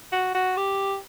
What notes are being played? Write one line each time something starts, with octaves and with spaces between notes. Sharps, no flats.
F#4
F#4
G4